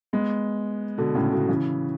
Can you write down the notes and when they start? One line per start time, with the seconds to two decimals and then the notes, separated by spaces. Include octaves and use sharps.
0.13 G#3 B3
0.98 B2 D3
1.15 A2 C#3
1.31 B2 D3
1.48 C#3 E3